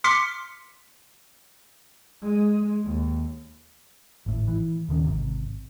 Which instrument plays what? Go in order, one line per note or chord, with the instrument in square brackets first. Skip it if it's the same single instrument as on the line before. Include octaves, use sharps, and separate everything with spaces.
[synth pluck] C6 D6 F6 B6 C#7
[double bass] G#3
D#2
[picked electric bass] G#1 A2
E3
D#1 D3 D#3 C#4
G#1 C3